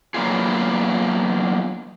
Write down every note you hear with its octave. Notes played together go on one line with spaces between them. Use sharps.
F#3 A#3 B3 D4 F4 G#4